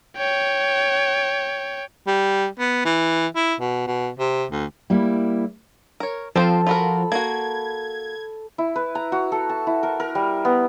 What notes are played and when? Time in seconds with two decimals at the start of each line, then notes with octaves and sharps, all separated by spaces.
0.17 C#5 G5
2.07 G3
2.60 B3
2.85 E3
3.36 E4
3.60 B2
3.87 B2
4.19 C3
4.51 D2
4.90 G3 A#3 E4
6.00 A#4 C#5
6.36 F3 C4 F4 A4 C5
6.67 F4 F#4 A#4 B5
7.12 A#3 F#4 G#6
8.58 E4
8.76 B4
8.95 A#5
9.12 F#4
9.32 A4
9.50 A5
9.67 E4
9.83 A#4
10.00 A#4
10.15 G3
10.45 B3